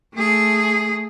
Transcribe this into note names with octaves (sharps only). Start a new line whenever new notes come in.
A3 G#4